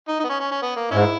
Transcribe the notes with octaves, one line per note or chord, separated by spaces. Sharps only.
D#4
D#4
B3
C#4
C#4
C#4
B3
A#3
G#2 C#4 E4